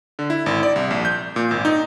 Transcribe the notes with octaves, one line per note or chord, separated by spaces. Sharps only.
D3
E4
G#1
D5
C2
A#1
G6
A#2
G#1
D#4